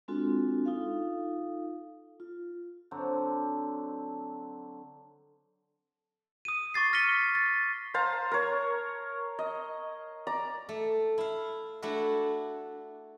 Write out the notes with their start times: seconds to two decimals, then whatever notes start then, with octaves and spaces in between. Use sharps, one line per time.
0.08 G#3 C4 D4 F4 F#4 A4
0.66 D#4 F4 A4 F5
2.20 F4
2.91 D3 F#3 C4 D4
6.45 D#6 D#7
6.74 C#6 D6 A6 C7
6.93 F6 A#6 B6 C#7 D#7 G7
7.35 A6
7.94 C5 F5 A5 A#5
8.31 A#4 C#5
9.39 D#5
10.27 D5 A#5
10.69 A3
11.18 E4 F5
11.82 A3 D4 E4 F#4